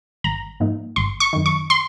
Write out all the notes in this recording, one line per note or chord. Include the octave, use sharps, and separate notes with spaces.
G#1 A#5
G#2 F3 A#3 D#4
G#1 C6
C#6
F#2 D#3
C#6
C6